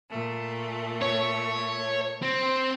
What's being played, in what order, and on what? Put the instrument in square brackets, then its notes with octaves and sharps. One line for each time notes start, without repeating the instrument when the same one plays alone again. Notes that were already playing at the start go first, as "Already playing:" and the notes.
[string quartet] A#2 A3
[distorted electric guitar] C#5
C4